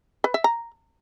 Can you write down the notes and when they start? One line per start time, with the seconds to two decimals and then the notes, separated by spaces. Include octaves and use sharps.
0.24 B4
0.34 E5
0.44 A#5